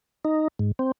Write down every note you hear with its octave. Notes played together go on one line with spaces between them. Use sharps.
D#4
G#2
C4